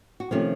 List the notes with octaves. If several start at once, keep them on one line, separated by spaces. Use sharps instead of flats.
F#4
C3 D#3 F3 A3 C#4 F4